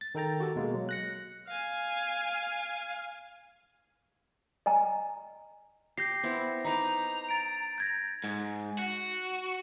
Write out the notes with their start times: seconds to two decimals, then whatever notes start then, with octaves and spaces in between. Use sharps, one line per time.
0.01 A6
0.15 D#3 D#4 A4 G5 A#5 A6
0.40 F#4 G4 A4
0.56 B2 G#3 A#3
0.74 F#3
0.89 F#6 A#6 C#7
1.48 F5 G#5
4.66 D#5 G#5 A#5
5.97 G4 G6 A#6 C7
6.23 B3 C4 E4
6.65 D#4 B4 A#5 D6
7.29 A6 D7
7.78 G6 G#6 A#6
8.24 G#2
8.79 F#4